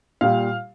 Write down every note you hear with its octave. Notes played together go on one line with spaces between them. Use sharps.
A#2 G3 F5